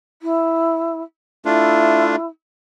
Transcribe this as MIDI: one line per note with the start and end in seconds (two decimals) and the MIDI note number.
0.22 1.01 64
1.45 2.16 57
1.45 2.16 62
1.45 2.26 64
1.45 2.16 65